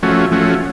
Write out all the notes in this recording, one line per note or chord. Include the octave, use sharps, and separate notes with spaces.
F3 A3 C#4 F#4
F3 A3 C#4 F#4